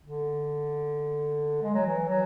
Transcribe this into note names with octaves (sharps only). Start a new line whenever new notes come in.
D3
G#3
F#3
E3
F#3